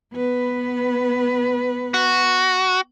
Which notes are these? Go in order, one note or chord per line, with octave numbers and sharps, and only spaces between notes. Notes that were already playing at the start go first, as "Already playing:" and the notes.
B3 B4
F#4